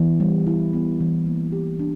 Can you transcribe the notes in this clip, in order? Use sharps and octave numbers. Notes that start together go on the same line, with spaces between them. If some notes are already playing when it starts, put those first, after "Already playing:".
Already playing: E3 B3
G3
E4
B3
E3
A#3
G4
D4